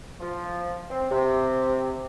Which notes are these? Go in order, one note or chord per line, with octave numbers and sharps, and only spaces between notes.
F3
C4
C3